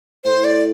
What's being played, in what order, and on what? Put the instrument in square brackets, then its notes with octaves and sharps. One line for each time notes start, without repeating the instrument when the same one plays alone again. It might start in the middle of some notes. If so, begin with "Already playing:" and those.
[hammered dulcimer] A2 [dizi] C5
[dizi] D5